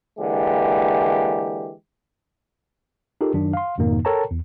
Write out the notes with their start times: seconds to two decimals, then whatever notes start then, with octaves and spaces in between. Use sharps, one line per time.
0.19 D3 E3 G#3 A#3 G4
3.21 D#4 F4 G4 A4 A#4
3.34 F#2 D#3 F#3 D4
3.53 F5 C6
3.78 F2 G#2 B2 D#3 A#3 D#4
4.05 A4 A#4 C#5 G5 A5 A#5
4.31 E2